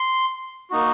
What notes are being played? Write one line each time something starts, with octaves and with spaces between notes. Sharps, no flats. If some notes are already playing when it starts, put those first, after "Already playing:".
Already playing: C6
A#3 D#4 F#4